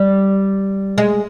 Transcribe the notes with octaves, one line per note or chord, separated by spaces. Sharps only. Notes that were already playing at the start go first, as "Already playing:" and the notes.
Already playing: G3
G#3